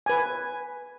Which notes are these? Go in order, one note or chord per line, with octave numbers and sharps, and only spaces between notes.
B4 G#5